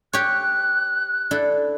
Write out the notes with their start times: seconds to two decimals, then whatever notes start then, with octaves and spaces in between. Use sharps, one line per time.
0.13 G4 C#5 F#6
1.31 D4 E4 A4